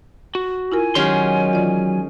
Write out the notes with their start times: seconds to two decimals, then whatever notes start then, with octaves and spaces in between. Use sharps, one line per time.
0.35 F#4
0.72 E4 F4 A#4 G#5
0.95 D#3 F#3 G#3 C#4 G4 C6
1.51 E3 F4 D5